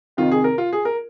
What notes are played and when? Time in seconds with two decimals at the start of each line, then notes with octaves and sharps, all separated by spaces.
0.17 F2 C3 D#3 F4
0.31 G#4
0.44 A#4
0.58 F4
0.73 G#4
0.85 A#4